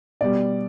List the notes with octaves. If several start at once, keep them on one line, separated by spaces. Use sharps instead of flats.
B2 G3 D5